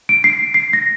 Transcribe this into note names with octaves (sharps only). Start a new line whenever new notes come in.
D7
C7
C7
A#6